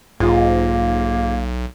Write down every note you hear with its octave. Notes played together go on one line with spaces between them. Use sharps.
B1 G#2 A#3 F4 G#4